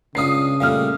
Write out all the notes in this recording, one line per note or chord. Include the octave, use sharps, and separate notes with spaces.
C#2 C#3 D4 F4 D#6 C7
A#2 G3 A3 F5 F6